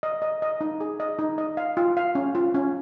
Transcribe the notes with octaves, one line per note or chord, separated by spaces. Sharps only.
D#5
D#5
D#5
D#4
G#4
D#5
D#4
D#5
F5
F4
F5
C#4
F4
C#4